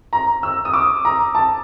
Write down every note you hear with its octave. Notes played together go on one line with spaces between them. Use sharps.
A#5
E6
D#6
D6
A#5
A5